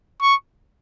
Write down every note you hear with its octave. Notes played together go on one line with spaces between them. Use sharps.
C#6